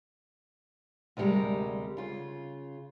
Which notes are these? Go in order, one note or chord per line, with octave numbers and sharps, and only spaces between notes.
D2 C3 F3 G3 G#3 A#4
C#3 F4